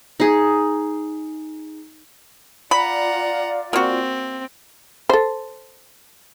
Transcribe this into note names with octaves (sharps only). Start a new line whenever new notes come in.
D#4 G#4
F4 D5 F#5 A#5 B5
A#3 C4 F#4
A4 C5